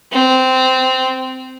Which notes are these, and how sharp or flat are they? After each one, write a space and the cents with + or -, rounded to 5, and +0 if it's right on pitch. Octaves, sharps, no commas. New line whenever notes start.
C4 -15